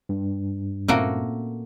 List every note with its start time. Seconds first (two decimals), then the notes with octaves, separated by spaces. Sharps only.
0.09 G2
0.88 A#2 A3 A#3 C4 C#4 F#4